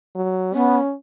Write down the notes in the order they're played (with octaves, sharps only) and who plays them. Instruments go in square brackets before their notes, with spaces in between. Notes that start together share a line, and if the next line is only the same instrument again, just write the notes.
[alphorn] F#3
[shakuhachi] B3 [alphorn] C#4